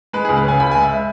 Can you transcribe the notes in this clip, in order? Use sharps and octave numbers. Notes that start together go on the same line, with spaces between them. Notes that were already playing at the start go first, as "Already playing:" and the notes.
G#3 B4
C#2 G#4
B4
C#3 G#5
C#2 B5
G#3 G#5
E5
E5